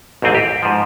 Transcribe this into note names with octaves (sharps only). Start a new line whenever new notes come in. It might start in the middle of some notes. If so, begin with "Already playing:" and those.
A1 D#2 G#2 C4 G#4
G4
G#2 F3